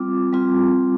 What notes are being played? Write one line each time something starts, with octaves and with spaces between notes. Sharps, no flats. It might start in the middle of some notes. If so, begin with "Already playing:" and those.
Already playing: G3 C4 F4 D6
G3 C4 F4